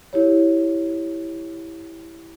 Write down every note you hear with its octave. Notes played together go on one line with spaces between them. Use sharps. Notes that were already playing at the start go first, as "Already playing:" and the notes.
E4 G4 C#5